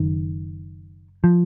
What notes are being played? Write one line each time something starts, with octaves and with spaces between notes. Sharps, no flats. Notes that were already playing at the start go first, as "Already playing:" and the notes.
Already playing: F#1 F#2 D#3
F3